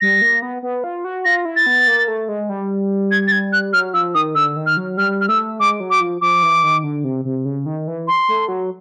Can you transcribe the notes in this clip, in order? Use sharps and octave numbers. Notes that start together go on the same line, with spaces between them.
G3 A#6
A#3
B3
B3
F4
F#4
F4 A#6
E4
A6
B3
A#3
A3
G#3
G3
G#6
A6
G#6
F#6
F#3 F6
F3 E6
D#3 D#6
D3 E6
D#3
F6
F#3
G3 F6
F6
A3 E6
G#3 D6
F#3
D6
F3
F3 D6
E3
D#3
D3
C3
C3
C#3
D#3
E3
C6
A3
F#3